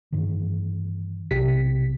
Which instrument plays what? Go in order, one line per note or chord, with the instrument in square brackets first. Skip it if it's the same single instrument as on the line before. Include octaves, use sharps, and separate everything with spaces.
[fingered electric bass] G2 D#3 E3
[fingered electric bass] B1 [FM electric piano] C3 G4 B6